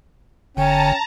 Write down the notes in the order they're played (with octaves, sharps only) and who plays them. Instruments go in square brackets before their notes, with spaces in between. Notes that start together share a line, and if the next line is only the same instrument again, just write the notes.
[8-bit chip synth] G1 D3 [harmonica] C#4 [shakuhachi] G5 [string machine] A5 A#5